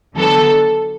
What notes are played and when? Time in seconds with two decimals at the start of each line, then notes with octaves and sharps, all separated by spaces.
0.16 D3 F#3 B3 A4